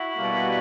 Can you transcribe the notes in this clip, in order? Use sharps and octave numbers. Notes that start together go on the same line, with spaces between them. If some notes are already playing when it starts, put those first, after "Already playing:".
Already playing: E4 F#4
B2 G3 A#3